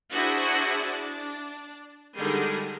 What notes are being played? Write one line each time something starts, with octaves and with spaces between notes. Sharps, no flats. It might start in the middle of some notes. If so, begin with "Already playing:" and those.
D4 E4 F#4 G#4 C5
D4
D3 D#3 G3 G#3 G#4